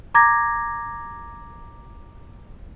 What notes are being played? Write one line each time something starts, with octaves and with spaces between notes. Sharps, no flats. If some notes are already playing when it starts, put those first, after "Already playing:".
A#5 D6 G#6 A#6